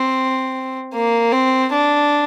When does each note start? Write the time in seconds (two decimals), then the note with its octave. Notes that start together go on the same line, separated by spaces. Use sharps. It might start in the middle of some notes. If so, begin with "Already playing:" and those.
Already playing: C4
0.94 A#3
1.32 C4
1.72 D4